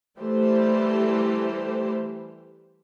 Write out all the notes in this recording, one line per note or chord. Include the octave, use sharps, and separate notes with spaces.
E3 G3 A3 G4 C5